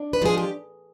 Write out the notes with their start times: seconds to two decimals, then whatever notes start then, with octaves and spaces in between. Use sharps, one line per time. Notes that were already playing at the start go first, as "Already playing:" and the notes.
Already playing: D4
0.13 B4
0.22 F3 G#3 G#4
0.37 G4